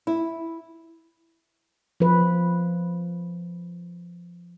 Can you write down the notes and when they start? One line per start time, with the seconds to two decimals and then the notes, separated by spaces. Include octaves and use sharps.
0.07 E4
2.00 F3 B4